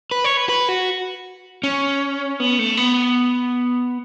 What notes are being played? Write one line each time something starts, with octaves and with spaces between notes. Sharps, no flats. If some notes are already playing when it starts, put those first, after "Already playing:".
B4
C#5
B4
B4
F#4
C#4
B3
A3
B3